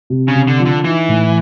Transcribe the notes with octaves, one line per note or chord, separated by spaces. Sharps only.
C3
C#3
C3
D3
F3
D3
E3 D#4
A2